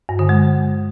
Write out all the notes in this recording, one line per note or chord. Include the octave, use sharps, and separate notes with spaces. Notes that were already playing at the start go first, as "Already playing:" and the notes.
G2
D3
G#3